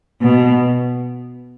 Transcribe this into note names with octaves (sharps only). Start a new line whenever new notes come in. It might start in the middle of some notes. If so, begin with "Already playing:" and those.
B2